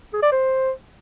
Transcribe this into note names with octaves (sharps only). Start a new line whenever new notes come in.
G#4
D5
C5